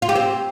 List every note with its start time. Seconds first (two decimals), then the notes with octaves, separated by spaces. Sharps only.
0.02 F4
0.09 G4
0.15 C4